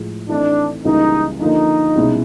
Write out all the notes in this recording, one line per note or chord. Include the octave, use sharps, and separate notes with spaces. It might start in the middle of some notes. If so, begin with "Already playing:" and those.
Already playing: A2 F3 G#3
E3 A3 C4 D4 D#4
C#2 C#3 E3 G3 A#3 D#4
D3 F3 A#3 D#4
C2 B2 G#3 C#4 E4